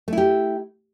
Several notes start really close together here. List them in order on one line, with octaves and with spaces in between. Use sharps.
A3 E4 G4